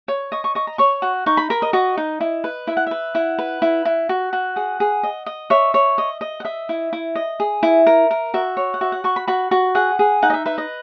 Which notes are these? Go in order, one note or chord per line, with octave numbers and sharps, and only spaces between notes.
C#5
D#5 C#6
C#6
D#5 C#6
A#5
C#5 C#6
F#4
D#4 C#6
B5
A#4 B5
D#5
F#4 D#5
D#4
E4
B4
E4 E5
F#5
B4 E5
E4 F#5
B4
E4
E4
F#4
F#4
G#4 F#5
G#4
D#5
D#5
C#5 E5
C#5
D#5
D#5
F#5
D#5 E5
E4
E4
D#5
G#4
E4
A#4
A#4
F#4 E5
C#5
F#5
F#4 E5
F#5
F#4 C#6
B5
F#4 B5
F#4
G#4 F#5
G#4
D#4 F#5
D#5
E5
B4 E5
D#5